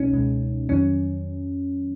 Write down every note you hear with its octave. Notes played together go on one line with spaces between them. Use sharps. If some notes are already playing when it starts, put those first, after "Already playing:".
Already playing: C#2 B2 G#3 C#4 D#4
C#2 B2 G#3
F2 D#3 F#3 C#4